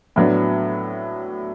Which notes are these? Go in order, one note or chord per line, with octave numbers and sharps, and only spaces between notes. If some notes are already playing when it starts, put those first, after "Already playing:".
A2 F#3 B3 D4